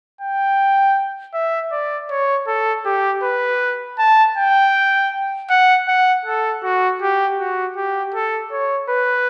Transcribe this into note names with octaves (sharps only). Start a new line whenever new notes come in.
G5
E5
D5
C#5
A4
G4
B4
A5
G5
F#5
F#5
A4
F#4
G4
F#4
G4
A4
C#5
B4